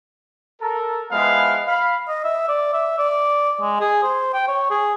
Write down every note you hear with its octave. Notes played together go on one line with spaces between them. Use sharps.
A4 A#4
F3 G#3 B3 E4 B4 F5
F5 B5
D#5
E5
D5
E5
D5
G#3
G#4
C5
G5
C#5
G#4